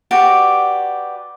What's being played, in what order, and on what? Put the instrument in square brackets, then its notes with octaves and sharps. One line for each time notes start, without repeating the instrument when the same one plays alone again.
[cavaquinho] F#4 G4 B4 D5